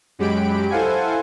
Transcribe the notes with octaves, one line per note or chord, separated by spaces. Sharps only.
F#2 F#3 G#3 G4 B5 D7
E4 A4 C5 F5 F#5 G#5